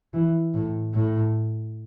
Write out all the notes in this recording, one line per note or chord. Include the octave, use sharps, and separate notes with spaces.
E3
A2
A2